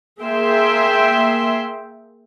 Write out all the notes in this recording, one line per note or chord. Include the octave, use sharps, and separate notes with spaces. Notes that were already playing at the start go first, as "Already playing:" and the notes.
A#3 G#4 E5 G5 C6